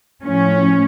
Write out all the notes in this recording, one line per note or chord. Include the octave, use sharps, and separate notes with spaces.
A2 F3 C#4